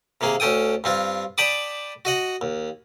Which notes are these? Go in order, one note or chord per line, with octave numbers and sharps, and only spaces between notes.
C3 D#3 A#3 G#4
D2 C#4 A4 G5 D#6
G2 C4 F4
D5 G5 A5 B5 D6 D#6
F#4 D#5 F#5
D#2